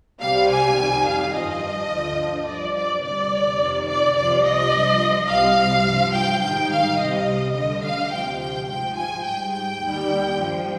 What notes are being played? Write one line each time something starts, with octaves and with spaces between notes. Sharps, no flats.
C2 C3 G3 F5
G#5
F2 D#3 G3
F5
G2 F3 D#5
D2 D3 F3
G2 F3 D5
D5
D2 C3 G3 D5
F2 C3 D#3
D5
C2 C3 F3 D5
D#5
G2 F3
C2 C3 G3 F5
G2 F3
G5
G#2 D#3 G3 G5
F5
C2 C3 G3 D#5
D2 D3 G3 D#5
F5
D2 C3 F3 G5
G5
G#2 F3 G5
G#5
G#2 G3 G5
G5
D#2 D#3 G3
G2 F3